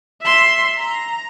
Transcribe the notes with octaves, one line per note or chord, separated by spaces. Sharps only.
E5 C6
A#5